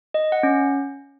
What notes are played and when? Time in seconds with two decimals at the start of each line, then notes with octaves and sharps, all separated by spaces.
0.14 D#5
0.32 F#5
0.43 C#4